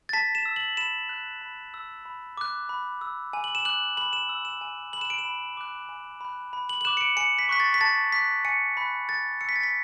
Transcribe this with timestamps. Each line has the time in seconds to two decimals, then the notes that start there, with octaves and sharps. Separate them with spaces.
0.09 A6
0.13 A5 B6
0.35 E7
0.45 E6
0.56 F#7
0.77 B5 E7
1.09 F#6
1.41 B5
1.74 E6
2.06 B5
2.37 D6 F#6
2.69 B5
3.01 E6
3.33 G#5
3.44 F#7
3.55 E7
3.65 D6 F#6 F#7
3.97 B5 F#7
4.13 E7
4.29 E6
4.45 E7
4.61 G#5
4.93 B5 F#6 F#7
5.01 E7
5.10 D7
5.19 E7
5.25 B5
5.57 D6 F#6
5.89 G#5
6.21 B5 F#6
6.53 B5
6.69 F#7
6.81 F#7
6.85 D6 F#6 E7
6.97 C#7
7.01 D7
7.17 G#5 C#7
7.39 B6
7.49 C#6 F#6 B6
7.60 A6
7.74 B6
7.81 A5 A6
8.12 D6 F#6 B6
8.45 G#5 C#7
8.77 B5 F#6 B6
9.09 B5 A6
9.41 E6 C#7
9.49 B6
9.56 A6
9.63 B6